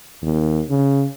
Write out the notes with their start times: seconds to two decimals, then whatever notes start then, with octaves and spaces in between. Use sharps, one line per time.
0.22 D#2
0.70 C#3